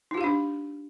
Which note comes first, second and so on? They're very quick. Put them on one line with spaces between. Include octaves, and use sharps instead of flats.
D#4 F4 G4 F5 D4